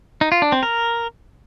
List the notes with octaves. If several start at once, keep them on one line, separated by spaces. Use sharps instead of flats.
D#4
F4
D4
C4
A#4